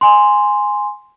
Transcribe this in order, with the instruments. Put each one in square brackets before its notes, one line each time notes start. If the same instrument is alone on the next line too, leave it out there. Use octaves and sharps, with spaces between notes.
[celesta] G#5 C6